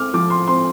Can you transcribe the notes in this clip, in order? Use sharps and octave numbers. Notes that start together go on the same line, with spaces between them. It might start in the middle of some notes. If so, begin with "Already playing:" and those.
Already playing: C4 D6 F6
F3 D6
C6
C4 C6